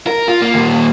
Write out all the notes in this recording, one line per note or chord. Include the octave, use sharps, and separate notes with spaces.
A#4
F4
A#3
D#2 A#2